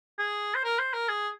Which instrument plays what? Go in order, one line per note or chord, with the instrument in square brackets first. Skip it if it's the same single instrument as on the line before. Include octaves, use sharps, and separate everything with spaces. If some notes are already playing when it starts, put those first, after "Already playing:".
[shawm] G#4
C5
A#4
C5
A#4
G#4